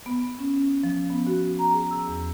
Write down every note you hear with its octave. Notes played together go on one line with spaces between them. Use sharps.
B3
C#4
F3
B3
F#4
A#5
G#4
E6
E2